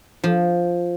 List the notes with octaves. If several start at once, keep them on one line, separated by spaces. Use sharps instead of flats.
F3